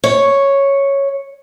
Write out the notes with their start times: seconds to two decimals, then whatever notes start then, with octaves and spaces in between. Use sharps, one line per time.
0.04 C#5